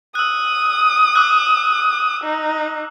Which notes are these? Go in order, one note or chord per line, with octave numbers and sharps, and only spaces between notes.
D#6 E6 F#6
D6 E6 F#6
D#4